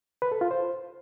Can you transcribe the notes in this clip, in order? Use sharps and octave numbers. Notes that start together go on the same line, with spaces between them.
B4
A4
F4
C5